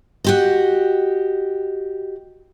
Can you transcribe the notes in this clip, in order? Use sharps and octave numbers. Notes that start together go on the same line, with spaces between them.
F#4 G4 D#5